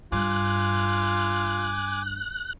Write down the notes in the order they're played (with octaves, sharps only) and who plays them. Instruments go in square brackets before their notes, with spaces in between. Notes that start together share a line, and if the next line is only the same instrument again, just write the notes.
[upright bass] G2 [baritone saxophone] F4 [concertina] G#5 D6 [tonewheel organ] F#6